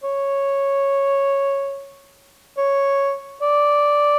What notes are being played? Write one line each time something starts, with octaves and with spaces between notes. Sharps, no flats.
C#5
C#5
D5